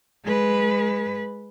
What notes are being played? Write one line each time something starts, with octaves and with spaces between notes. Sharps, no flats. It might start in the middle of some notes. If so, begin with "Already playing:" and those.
G#3 B4